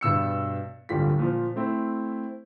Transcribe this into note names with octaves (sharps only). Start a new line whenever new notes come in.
G2 B2 E6 C#7
D1 G1 G3 F4 B6
A#2 F3
A3 C4 E4